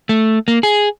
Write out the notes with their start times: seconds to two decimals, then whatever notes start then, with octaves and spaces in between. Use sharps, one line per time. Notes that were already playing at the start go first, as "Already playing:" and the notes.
0.09 A3
0.48 A#3
0.63 G#4